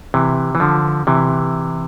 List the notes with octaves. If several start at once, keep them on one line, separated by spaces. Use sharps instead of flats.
C3 E3
E3
D3 F3
C3 E3